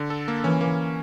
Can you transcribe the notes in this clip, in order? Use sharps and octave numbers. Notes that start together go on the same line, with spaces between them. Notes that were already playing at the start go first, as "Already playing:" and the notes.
Already playing: D3
A4
A#3
E3 C#4
A#3